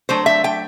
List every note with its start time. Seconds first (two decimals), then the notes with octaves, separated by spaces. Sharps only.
0.09 F#3 A3 D4 C5
0.26 E5
0.44 G5